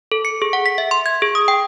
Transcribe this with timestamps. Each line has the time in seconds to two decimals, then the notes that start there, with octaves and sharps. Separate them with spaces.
0.12 A4
0.25 C#7
0.42 G#4
0.53 F#5
0.66 B6
0.78 E5
0.91 C6
1.06 G#6
1.22 G#4
1.35 D#6
1.48 G5